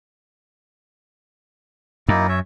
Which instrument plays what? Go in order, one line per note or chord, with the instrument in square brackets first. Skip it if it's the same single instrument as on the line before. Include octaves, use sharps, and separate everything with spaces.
[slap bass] F#2 [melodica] A#3 D#4 E4
[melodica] C#5 E5